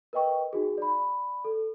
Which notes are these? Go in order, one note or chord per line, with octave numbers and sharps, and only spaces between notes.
A#4 B4 D#5 G5 C#6
D#4 F#4 G#4
D5 B5
A4